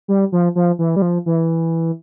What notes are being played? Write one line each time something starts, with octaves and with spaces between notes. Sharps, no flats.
G3
F3
F3
E3
G3
F3
E3